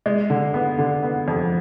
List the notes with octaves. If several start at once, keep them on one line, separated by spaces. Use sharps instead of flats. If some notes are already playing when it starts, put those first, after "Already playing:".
G#3
D3
B3
D3
B3
F2